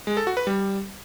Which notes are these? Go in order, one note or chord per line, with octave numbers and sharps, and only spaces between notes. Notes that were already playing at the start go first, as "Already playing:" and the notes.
G#3
A4
F#4
B4
G3